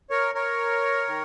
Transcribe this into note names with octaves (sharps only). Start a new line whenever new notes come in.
A#4 C#5
A#4 C#5
D#3